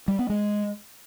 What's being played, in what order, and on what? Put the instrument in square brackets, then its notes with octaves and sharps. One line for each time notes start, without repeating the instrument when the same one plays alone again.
[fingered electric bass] G3
B3
G#3